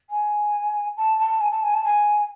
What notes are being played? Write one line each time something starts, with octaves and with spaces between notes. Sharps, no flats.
G#5
A5
A5
G#5
A5
G#5
A5
G#5